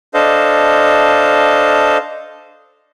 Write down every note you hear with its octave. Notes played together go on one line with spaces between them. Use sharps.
D4 A4 C5 D#5 F5